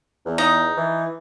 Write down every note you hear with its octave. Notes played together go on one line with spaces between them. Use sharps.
E2
D#4
E3